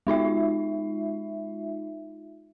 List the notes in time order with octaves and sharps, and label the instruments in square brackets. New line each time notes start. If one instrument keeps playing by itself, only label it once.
[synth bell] G#3 D#4 F4 E5